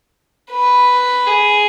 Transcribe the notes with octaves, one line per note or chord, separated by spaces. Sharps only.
B4
G#4